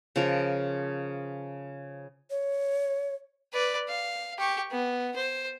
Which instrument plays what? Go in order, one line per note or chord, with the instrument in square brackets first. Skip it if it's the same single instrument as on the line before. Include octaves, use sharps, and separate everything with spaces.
[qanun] C#3 F3 A#4
[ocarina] C#5
[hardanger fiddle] B4 D5
F5
G4 C#6
B3
C5